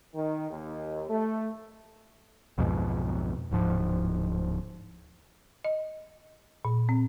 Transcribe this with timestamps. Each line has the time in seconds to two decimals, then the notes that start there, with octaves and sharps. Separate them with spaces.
0.14 D#3
0.51 D#2
1.09 A3
2.58 B1 F2 G#2 B2
3.51 D1 G#2 F3
5.64 D#5
6.65 A#2
6.89 C4